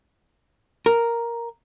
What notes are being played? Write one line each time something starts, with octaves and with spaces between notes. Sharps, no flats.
A#4